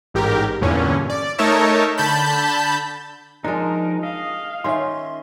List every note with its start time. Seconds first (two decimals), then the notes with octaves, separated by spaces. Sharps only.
0.14 A1 G#2 G4 A#4
0.61 E2 G2 A#2 D3 C#4
1.10 D5
1.38 A3 D#4 A#4 C#5 E5 A5
1.98 D3 A5 B5 G6
3.45 F3 G#3 D4 D#4 A#4
4.03 D#5 F5
4.64 D#3 C#4 F4 E5 C6